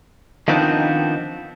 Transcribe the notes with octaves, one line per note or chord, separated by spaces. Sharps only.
D#3 F3 B3 C4 D4 D#4